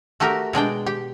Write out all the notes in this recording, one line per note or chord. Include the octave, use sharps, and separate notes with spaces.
A3 F#4 G4 A#4
B2 G#3 D4 G5
G4